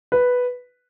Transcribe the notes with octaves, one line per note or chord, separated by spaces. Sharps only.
B4